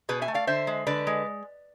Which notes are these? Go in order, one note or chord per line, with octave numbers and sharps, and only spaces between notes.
B2 G#4 B4
E5 G#5
A3
D5 F5
D3 C5 E5
G#3
D3 B4 D5
G#3